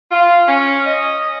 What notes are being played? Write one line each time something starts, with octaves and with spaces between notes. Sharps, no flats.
F4
C#4
D#5